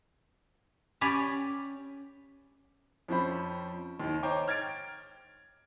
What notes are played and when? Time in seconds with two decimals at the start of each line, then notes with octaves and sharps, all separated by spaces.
1.01 C#4 G4 D5 G#5 B5
3.08 F2 F3 C#4 C5 B5
4.00 D#2 D#3
4.23 C5 C#5 D#5 G5 A#5 D6
4.48 F6 G#6 A6 D7